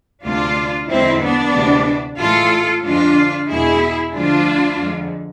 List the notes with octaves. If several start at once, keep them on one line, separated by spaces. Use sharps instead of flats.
D2 C3 G#3 D4 F4
E2 D3 F3 G#3 C4 E4
B3 D4
D2 C3 E3 G#3
A2 E3 G#3 F4 A4
F2 D3 G#3 D4 F4
E2 B2 G#3 E4 G#4
D2 D3 F3 G#3 D4 F4
F2 D3 G#3